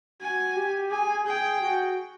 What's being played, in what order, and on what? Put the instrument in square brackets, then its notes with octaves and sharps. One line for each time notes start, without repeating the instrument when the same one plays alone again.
[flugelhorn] F#4 [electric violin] G#5
[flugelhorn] G4
[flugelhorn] G#4 [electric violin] G#5
[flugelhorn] G#4 [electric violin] G5
[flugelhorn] F#4